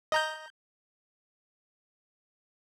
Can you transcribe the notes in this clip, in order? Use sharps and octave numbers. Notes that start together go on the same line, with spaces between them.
D#5 A#5 G6